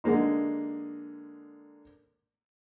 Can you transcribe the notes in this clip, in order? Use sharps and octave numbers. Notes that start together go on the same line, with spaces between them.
D3 G#3 A#3 D#4